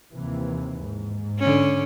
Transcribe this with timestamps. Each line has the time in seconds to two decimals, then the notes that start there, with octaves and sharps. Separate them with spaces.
0.12 D#2 C3 E3
0.82 G#2
1.39 D3 C#4